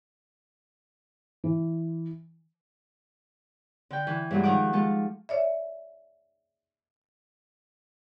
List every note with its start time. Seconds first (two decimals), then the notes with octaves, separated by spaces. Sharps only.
1.44 E3
3.90 D3 G5
4.07 E3
4.31 G2 F#3 G#3
4.43 D#3 F3 F#5 D6
4.73 G#3 F4 A4
5.29 C#5 D5 E5